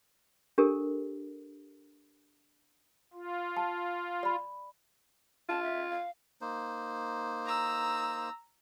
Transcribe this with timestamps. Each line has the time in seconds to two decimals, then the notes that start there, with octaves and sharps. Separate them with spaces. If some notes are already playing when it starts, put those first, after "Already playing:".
0.58 D4 G4 A4 A#4
3.13 F4
3.57 A5
4.23 D5 B5
5.49 F4 A5
5.63 E5
5.90 F5
6.41 A#3 D#4 C5
7.46 A#5 E6